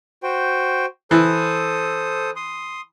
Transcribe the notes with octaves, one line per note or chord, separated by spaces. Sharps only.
F#4 C5 G5
E3 A4 C5 D#6
C6 D#6